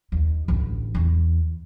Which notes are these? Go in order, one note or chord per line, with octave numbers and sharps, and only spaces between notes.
D#2
A1 D2
E2